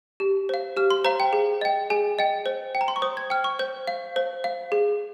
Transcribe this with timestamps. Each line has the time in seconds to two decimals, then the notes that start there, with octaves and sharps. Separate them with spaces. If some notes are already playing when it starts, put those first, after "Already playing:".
0.20 G4
0.49 C5 F5
0.77 G4 F6
0.90 C6
1.04 C5 F5 A#5
1.20 G5
1.33 G#4
1.61 D#5 G5
1.90 G#4 G#5
2.19 D#5 G5
2.46 C5
2.75 G5
2.81 A#5
2.88 C6
2.96 C#6
3.02 C5 D#6
3.17 G#6
3.30 G5 F6
3.44 C#6
3.59 C5 G6
3.87 F5
4.16 C5
4.44 F5
4.72 G#4